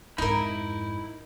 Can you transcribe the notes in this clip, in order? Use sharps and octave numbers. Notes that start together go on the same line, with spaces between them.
F2 G#2 D#4 E4 A#4 B5